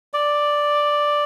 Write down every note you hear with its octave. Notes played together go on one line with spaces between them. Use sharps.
D5